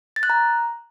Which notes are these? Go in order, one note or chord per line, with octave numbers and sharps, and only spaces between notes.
A6
F#6
A#5